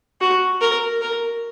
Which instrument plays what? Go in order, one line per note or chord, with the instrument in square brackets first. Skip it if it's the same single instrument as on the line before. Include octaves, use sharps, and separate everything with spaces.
[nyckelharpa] F#4
A#4
A#4